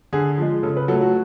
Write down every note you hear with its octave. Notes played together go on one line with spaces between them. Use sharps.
D3 G#4
F3 G#3
C#3 A4
B4
F#3 A3 A4
F#4